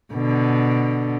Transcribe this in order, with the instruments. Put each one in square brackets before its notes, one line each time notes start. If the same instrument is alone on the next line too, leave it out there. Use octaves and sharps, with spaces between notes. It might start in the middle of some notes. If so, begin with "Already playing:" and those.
[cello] B2 D3